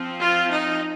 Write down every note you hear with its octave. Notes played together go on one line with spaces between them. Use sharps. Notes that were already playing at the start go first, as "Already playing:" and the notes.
Already playing: F3 C4
F4
D#4